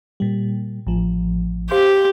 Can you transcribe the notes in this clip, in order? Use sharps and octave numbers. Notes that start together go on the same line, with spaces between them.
A#2 G3
A1 F3
G4 C5 F5 C6